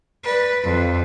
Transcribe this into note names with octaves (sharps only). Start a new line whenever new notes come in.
B4 D5
F2